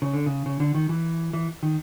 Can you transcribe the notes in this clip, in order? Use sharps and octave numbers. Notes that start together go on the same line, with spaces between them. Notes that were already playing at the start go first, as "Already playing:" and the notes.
C#3
D3
C#3
C#3
D3
D#3
E3
E3
D#3